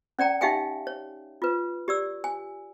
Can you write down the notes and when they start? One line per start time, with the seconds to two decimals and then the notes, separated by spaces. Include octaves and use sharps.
0.19 C#4 D5 G5 A#5
0.41 D#4 G4 E5 F5 G5 G#5
0.87 C#5
1.42 F4 B4
1.88 G4 D5 E6
2.24 G#5